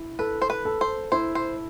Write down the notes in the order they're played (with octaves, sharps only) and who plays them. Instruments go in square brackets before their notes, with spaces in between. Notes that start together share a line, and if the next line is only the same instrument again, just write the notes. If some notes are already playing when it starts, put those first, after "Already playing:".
Already playing: [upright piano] E4
[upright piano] A4 [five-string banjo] B4
[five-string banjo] C5
B4
[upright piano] A4
[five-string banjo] C5
[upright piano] E4 [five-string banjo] C5
[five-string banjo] C5